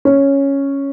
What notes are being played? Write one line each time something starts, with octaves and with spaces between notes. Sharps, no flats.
C#4